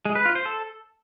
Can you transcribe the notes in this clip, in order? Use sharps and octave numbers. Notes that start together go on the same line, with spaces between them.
G#3
B4
F4
C5
A4